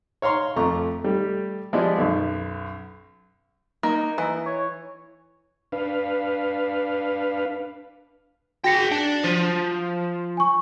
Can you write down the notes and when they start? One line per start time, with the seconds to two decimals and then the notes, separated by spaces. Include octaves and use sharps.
0.22 C#5 F5 A#5 C6 C#6
0.56 F2 A3 F4 A#5 C#6 D6
1.04 G3 A3 G4
1.73 F3 G#3 B3 E4 G4 D5
1.98 B1 F#2
3.83 A#3 D#4
4.18 E3
4.46 C#5
5.72 D4 B4 F5
8.64 F#4 G#4 G5 A#6 C#7
8.91 D4
9.24 F3
10.37 G#5 C#6